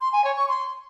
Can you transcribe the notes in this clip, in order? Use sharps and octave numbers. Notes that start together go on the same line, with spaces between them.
C6
G#5
C#5
C#6
C6